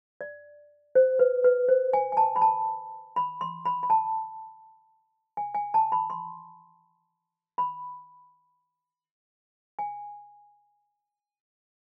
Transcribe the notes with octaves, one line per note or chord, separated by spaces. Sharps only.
D5
C5
B4
B4
C5
G#5
G#5
A5
B5
A5
B5
C6
B5
B5
A5
G#5
G#5
A5
B5
C6
B5
G#5